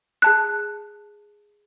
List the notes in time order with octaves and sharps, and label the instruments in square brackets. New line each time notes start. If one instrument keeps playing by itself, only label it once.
[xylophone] G#4 A5 F#6